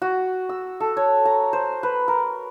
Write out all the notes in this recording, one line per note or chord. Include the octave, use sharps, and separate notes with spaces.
F#4
E6
A4
C#5
A#5
C5
B4
A#4